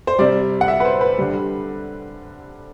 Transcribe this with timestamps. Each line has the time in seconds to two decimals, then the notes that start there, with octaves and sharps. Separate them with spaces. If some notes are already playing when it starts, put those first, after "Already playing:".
0.07 C5
0.19 C3 G3 D5
0.61 F#5
0.68 E5
0.80 B4
0.85 C5
1.01 B4
1.18 D3 G3